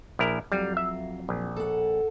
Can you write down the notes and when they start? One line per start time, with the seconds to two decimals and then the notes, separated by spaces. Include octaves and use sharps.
0.19 A#1 E4 A#4
0.52 F2 F#3 G3 F5
0.77 E5
1.29 A#1
1.56 A4 F#5